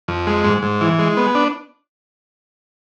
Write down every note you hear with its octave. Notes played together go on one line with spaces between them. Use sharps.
F2
G#3
G#2
G#2
E3
G#3
B3
D4